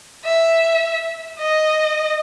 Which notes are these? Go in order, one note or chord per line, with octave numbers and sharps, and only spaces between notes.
E5
D#5